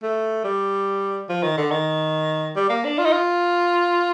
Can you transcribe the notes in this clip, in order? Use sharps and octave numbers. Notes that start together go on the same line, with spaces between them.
A3
G3
F3
D#3
D3
D#3
G3
A#3
D4
F4
D#4
F4